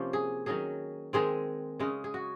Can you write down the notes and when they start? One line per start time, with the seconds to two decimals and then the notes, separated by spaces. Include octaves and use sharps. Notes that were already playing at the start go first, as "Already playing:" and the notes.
Already playing: C3 F3 A#3 C#4 C5
0.13 G#4
0.46 D#3 F#3 C#4 G#4
1.13 D#3 G#3 C4 G#4
1.79 C#3 G#3 C#4
2.04 G#4
2.14 F#4